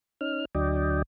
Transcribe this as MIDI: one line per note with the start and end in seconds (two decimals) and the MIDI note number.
0.21 0.45 61
0.21 0.45 63
0.21 0.45 89
0.55 1.02 38
0.55 1.02 54
0.55 1.02 62
0.55 1.02 74
0.55 1.02 75
0.55 1.02 79